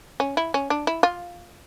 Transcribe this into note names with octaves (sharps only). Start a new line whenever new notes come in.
C#4
E4
C#4
D4
E4
F4